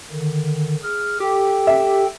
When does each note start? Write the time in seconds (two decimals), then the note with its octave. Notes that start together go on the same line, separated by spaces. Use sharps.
0.11 D3 D#3
0.83 G#4 F6
1.20 G4 A4 G5
1.67 E5